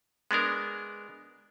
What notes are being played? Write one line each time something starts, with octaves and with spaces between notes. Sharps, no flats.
G#3 B3 D4 A#4